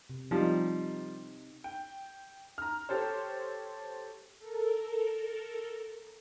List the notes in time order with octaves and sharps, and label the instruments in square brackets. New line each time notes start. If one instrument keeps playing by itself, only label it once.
[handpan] C3
[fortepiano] F3 G3 [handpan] C4 D#4 G4
[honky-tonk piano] G5
A#5 F6
G4 A4 C5 C#5
[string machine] A4 A#4